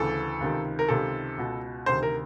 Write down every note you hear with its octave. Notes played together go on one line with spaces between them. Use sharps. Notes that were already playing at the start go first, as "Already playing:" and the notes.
Already playing: D2 C#3 E3 A4
C#2 C3 D#3
A#4
C#2 C3 D#3 A4
C#2 B2
D2 C3 D#3 C5
A#4